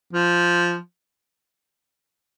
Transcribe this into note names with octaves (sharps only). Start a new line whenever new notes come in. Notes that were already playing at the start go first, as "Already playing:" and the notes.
F3